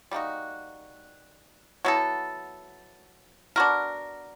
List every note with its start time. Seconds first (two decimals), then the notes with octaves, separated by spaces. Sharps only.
0.11 G3 A#3 D#4 F#4
1.85 F#3 B3 E4 A4
3.56 B3 D4 F#4 A#4